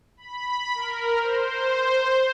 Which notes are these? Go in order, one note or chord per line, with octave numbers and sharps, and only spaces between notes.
B5
A#4
C5